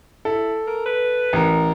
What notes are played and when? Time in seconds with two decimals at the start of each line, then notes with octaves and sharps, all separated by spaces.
0.25 E4 A4
0.67 A#4
0.85 B4
1.33 A1 A#4